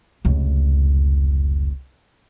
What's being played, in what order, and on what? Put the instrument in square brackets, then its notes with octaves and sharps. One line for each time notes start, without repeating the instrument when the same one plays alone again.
[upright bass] F1 C#2